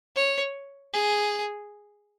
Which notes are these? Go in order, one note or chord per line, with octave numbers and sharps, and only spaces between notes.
C#5
G#4